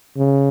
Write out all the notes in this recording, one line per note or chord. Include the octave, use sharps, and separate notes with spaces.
C#3